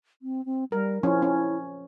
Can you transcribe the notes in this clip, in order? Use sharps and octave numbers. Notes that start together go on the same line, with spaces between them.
C4
C4
G3 A#4
F3 C#4 E4
C#4